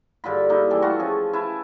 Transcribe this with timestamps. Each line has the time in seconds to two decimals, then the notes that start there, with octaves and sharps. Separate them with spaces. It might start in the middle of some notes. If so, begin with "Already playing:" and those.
0.24 G2 D3 F4 B5
0.49 A#3 D#4 E4
0.70 E3 G3 A4
0.82 A3 F4 F#4
0.99 F3 C#4 G#4
1.33 E4 B4 A5